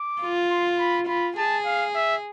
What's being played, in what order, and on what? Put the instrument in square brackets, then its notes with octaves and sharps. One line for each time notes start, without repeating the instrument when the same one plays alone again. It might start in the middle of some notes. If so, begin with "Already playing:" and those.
Already playing: [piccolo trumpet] D6
[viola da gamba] F4
[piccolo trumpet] C6
B5
[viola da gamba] F4 [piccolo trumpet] B5
[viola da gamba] G#4 [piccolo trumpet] A5
[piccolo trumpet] F5
E5